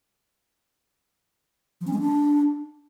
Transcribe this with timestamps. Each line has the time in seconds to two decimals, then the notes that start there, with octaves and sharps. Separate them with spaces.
1.81 F3
1.87 C#4
1.93 G#3
1.99 D4